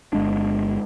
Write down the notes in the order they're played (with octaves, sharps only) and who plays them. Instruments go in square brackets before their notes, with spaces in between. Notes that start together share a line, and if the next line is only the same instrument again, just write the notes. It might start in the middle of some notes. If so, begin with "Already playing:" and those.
[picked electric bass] G1 G#3 D4